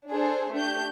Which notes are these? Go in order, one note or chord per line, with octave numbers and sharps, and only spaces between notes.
D4 G#4 A4 C5
A3 D4 G4 G6